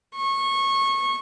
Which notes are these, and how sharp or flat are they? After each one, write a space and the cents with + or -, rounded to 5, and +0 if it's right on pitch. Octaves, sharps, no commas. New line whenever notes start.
C#6 -20